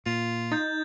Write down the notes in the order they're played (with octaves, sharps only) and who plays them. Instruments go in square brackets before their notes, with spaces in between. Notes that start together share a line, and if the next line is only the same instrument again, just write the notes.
[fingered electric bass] A#2 [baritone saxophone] F4
[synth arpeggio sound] D#4 [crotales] G6 A6